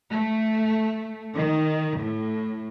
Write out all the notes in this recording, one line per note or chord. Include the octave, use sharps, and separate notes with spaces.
A3
D#3
A2